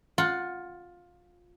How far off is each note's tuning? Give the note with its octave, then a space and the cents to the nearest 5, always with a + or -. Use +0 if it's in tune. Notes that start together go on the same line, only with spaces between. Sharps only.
F4 +15 F#5 +0